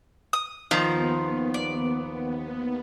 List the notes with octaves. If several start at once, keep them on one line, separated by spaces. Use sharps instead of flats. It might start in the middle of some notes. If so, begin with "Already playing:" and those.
D#6
D#2 D#3 F3 B3 F4
D5